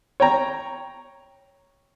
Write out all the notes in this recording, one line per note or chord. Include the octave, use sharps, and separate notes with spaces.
C#5 G5 A#5